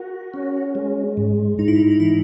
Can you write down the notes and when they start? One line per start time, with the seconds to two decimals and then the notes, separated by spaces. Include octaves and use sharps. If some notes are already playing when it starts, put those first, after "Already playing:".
Already playing: F#4 G#4 A#4
0.34 C#4
0.75 G#3
1.17 G#2
1.58 G#2 D#4
1.68 E4
1.76 D#4
1.91 D#4
2.00 E3 E4